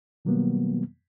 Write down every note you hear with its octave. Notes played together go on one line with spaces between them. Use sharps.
B2 D#3 F#3 G3 A#3 B3